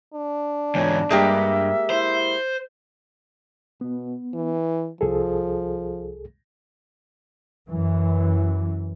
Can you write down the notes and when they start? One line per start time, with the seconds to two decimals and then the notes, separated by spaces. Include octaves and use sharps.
0.14 D4
0.75 E2 G#2 C#5
1.10 G2 G#3 A#3 G4 E5
1.90 E4 C5
3.81 B2 B3
4.34 E3
5.01 C2 F3 G#4 A4
7.68 F#2 E3